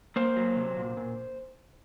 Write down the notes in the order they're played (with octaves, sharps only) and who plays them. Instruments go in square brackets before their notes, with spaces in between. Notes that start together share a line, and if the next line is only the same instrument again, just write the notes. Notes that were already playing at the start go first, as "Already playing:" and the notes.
[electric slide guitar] A#3 C5
F#3
C3
A#2
A#2